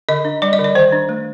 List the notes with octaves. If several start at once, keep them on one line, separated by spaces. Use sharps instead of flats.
D3 D#5
D4
G3 D5
D#5
D3
D5
D#3 C5
D4
A3